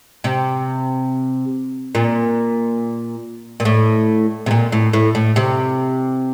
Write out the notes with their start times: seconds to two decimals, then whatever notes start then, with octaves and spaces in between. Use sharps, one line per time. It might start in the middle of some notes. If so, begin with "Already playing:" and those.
0.24 C3
1.95 A#2
3.60 A#2
3.65 A2
4.46 C3
4.51 A#2
4.72 A2
4.93 A2
5.15 A2
5.36 C3